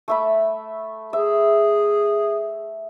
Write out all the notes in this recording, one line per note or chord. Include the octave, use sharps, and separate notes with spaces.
A3 E5 B5
G#4 E5